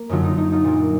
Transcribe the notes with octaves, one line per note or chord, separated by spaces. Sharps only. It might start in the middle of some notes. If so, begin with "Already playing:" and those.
Already playing: A#3
F#2 D3 F#3 D#4 F4
D#4
D#4
D#4 F4
A#2 F#3 A#3